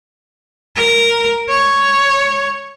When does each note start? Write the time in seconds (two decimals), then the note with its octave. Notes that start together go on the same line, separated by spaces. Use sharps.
0.76 A#4
1.49 C#5